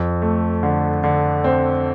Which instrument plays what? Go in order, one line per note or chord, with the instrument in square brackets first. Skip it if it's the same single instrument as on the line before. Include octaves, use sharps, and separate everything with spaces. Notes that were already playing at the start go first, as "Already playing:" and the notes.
Already playing: [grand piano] F2
A3
D3
D3
C4